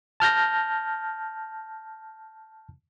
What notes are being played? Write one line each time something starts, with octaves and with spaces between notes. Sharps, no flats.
A5 F6 G6 A#6